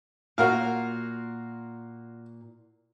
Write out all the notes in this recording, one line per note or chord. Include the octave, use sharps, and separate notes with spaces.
A#2 F#4 A#4 F5